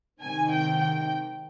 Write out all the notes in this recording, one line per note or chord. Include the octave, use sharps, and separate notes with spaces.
C3 D#3 G#3 C4 G#5
G5
G5